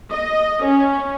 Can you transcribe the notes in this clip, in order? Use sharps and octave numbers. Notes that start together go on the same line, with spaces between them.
D#5
C#4